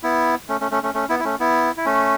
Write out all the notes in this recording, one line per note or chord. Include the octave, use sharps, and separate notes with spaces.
B3 E4
A3 C#4
A3 C#4
A3 C#4
A3 C#4
A3 C#4
B3 E4
E4
A3 C#4
B3 E4
E4
A3 C#4